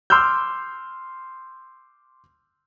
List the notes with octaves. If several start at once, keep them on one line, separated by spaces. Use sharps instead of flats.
C6 D6 E6 F6 G6